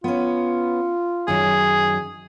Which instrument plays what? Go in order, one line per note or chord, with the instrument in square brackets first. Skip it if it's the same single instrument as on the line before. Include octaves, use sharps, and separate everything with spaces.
[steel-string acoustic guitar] B3 C#4 [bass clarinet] F4
[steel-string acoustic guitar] F#2 D#3 F#3 [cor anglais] G#4